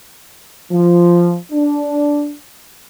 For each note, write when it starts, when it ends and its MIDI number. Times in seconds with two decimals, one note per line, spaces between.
0.71 1.36 53
1.52 2.35 62